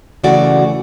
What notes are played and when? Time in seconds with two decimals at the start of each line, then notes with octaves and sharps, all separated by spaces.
0.23 D2 C#3 E3 A3 F#4 D5